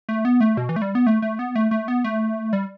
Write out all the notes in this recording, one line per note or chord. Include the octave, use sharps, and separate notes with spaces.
A3
B3
A3
B2
E3
A3
G3
B3
A3
A3
B3
A3
A3
B3
A3
G3